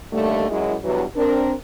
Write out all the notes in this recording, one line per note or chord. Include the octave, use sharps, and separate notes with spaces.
D#2 D3 G3 A3
F#2 F#3 G#3 E4
E2 G2 E3 F#3
C4 D4 A#4